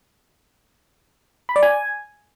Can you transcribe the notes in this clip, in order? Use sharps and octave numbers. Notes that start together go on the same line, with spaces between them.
B5
D5
G#5